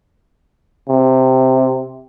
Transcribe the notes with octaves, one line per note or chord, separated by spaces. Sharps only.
C3